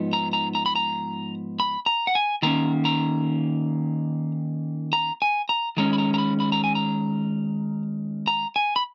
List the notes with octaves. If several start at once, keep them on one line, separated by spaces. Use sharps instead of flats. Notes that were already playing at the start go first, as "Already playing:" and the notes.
Already playing: G#2 F3 B3 D#4
A#5
A#5
A#5
B5
A#5
B5
A#5
F#5
G#5
D#3 A#3 C#4 A#5
A#5
A#5
G#5
A#5
D#3 G#3 C#4 A#5
B5
A#5
A#5
B5
B5
A#5
G#5
A#5
A#5
G#5
B5